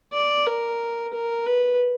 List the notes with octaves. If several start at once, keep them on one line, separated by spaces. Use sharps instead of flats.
D5
A#4
A#4
B4